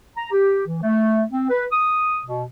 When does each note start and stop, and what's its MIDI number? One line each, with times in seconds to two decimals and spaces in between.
0.16 0.31 82
0.31 0.62 67
0.66 0.78 52
0.82 1.24 57
1.32 1.47 60
1.49 1.64 71
1.72 2.20 87
2.25 2.45 47